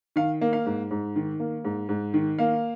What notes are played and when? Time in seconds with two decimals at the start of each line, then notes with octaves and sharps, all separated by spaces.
0.16 D#3 F5
0.41 A#3
0.53 F5
0.66 G#2
0.91 G#2
1.16 D#3
1.40 A#3
1.64 G#2
1.89 G#2
2.14 D#3
2.39 A#3 F5